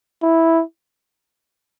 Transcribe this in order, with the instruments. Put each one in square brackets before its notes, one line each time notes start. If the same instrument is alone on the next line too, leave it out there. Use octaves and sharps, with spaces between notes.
[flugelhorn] E4